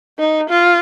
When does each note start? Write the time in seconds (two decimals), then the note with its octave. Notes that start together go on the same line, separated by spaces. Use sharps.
0.19 D#4
0.50 F4